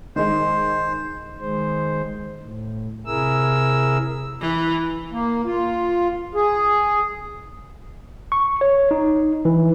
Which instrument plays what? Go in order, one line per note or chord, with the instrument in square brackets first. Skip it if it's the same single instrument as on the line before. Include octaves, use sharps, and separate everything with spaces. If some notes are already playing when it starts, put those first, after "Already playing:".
[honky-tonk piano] D#3 G#3 [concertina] C5
[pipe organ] D#3 G#3 C5
A2
C3 E4 G#4 A#4 E6
[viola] E3
[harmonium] A#3
F4
G#4
[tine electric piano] C#6
C#5
D#4
E3